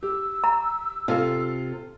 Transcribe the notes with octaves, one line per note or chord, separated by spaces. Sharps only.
G4 E6
A#5
C3 F4 A4 F5